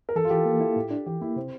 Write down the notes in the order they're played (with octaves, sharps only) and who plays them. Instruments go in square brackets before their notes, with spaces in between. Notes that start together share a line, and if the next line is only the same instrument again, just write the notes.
[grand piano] A#4
[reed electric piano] E3 [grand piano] A4
[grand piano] F4
[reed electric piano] E3 [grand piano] G4
[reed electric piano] A#3
E4
A2
D4
[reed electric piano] E3 [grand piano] G4
[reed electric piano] A#3 [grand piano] E4
[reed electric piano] C3 [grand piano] C4